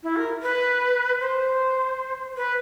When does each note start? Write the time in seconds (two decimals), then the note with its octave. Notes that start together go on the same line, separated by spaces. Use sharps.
0.03 E4
0.17 A#4
0.42 B4
1.20 C5
2.37 B4